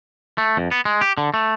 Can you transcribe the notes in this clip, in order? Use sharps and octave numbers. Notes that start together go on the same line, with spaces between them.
A3
F2
B3
G#3
G4
D3
A3